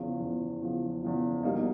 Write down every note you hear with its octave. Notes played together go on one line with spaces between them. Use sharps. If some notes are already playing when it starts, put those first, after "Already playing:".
Already playing: E2 C#3 F3
E2 C#3 F3
E2 C#3 F3
E2 C#3 F3
B2 G3 A#3 D#4